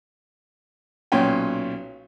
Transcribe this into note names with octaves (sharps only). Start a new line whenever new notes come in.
B1 A#2 C#4 G5